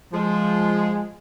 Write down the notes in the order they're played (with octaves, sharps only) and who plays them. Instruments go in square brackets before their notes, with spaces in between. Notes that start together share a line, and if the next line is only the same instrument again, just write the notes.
[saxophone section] F3 G#3